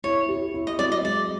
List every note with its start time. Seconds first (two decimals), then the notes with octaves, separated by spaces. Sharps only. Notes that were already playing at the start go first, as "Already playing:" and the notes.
0.04 E4 C#5
0.29 G4
0.54 E4
0.67 D#5
0.79 F#3 D5
0.92 D#5
1.05 G#3 D5